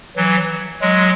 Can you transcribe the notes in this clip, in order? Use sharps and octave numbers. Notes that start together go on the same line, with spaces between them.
E3 F#3
F#3 G#3